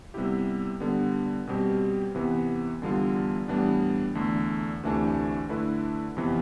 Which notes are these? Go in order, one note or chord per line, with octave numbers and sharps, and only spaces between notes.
C3 G3 B3 E4 G4
D3 G3 B3
B2 G3 C4 G4
C3 E3 B3
E2 D3 G3 B3 F4
A2 E3 G3 B3 D4
E2 D3 A3
D2 C3 E3 A3 D4
D3 A3 E4 B4
F2 C3 E3 B3